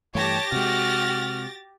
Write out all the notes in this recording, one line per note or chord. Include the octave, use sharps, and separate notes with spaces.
G2 E3 A3 G4 C#5 A5 A6 A#6
C3 G#3 F#4 F6